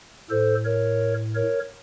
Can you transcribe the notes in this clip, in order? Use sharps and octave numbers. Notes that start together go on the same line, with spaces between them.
A2 A4 C5
A#4 C#5
A#4 C#5